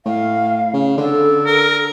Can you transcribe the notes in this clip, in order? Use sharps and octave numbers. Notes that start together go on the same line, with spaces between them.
A2 F5
C#3
D3 A4
A#4